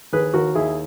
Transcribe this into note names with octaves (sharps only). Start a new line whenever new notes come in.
D#2 G#4 B4
D#2 F#4 A#4
D#2 E4 G#4